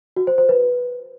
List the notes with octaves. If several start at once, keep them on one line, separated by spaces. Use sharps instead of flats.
F#4
C5
C5
B4